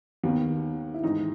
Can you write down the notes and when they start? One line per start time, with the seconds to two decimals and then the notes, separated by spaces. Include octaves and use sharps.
0.23 D#2 D#3 B3
0.94 E4
1.03 G#2 E3 D#4